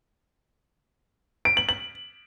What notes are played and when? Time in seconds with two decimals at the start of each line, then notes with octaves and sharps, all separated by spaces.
1.45 D7
1.57 F#7
1.69 F#7